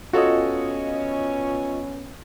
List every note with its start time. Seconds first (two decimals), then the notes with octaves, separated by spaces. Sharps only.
0.13 B3 C#4 F4 F#4 A4 C#5 D#5